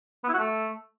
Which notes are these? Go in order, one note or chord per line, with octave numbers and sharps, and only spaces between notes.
B3
E4
F#4
A3